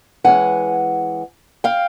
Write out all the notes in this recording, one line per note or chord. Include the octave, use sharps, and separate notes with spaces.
E3 G#3 C#4 F#5 G#5
F5 G5